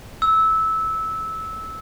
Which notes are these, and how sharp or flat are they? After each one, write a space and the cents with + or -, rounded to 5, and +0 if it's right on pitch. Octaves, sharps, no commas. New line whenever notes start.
E6 -15